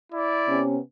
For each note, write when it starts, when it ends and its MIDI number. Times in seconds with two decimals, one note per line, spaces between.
0.12 0.63 64
0.12 0.63 74
0.48 0.78 48
0.48 0.78 59
0.48 0.78 61